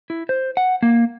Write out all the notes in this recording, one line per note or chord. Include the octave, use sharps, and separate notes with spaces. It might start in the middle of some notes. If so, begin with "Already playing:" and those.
E4
C5
F#5
A#3